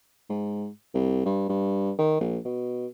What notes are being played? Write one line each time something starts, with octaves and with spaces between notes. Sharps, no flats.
G#2
C2
G2
G2
D#3
A#1
B2